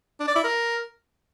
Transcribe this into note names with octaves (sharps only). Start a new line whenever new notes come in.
D4
D5
E4
A#4